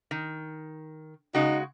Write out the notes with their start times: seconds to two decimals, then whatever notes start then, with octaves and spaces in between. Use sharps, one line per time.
0.11 D#3
1.35 C#3 G#3 D#4 F#4